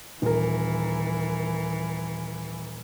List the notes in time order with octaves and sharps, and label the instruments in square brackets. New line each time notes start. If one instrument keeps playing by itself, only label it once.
[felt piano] D#1 A#4 [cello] E3